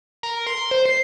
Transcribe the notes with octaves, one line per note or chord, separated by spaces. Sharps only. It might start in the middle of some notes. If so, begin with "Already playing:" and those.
A#4
C6
C5
C7